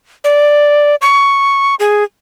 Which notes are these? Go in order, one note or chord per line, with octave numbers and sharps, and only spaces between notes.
D5
C#6
G#4